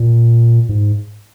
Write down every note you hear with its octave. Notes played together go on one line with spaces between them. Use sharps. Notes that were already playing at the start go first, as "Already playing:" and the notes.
Already playing: A#2
G#2